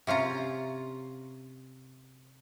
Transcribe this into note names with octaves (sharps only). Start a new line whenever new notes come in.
C3 C#4 F4 A#5